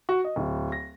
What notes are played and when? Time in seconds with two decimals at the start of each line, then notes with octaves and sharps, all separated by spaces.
0.09 F#4
0.25 D#5
0.36 D1
0.72 A#6